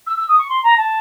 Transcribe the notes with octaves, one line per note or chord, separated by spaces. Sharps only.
E6
E6
D#6
C#6
C6
A#5
A5